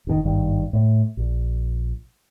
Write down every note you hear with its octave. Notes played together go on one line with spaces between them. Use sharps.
F1 C3 D#3
G#1 G2 D#3
A2
A#1